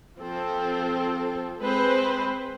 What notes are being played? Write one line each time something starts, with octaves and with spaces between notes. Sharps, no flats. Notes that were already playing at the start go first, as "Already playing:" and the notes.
F3 C4 A4
G#3 C4 B4 C5